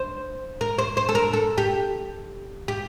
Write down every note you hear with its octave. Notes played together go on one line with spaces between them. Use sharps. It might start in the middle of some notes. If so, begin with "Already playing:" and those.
Already playing: C5
A#4
C5
C5
A4
A#4
A4
G4
G4